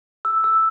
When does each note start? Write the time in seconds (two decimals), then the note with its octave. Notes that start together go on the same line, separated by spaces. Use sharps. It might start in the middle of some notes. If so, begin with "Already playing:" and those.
0.25 E6
0.44 E6